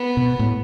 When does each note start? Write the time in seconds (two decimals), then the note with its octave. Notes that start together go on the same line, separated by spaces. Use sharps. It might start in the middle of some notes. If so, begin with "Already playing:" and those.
Already playing: B3
0.17 B2
0.39 A2